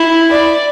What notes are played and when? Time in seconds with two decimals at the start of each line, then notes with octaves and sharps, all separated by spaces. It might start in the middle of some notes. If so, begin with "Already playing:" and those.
Already playing: E4
0.32 D5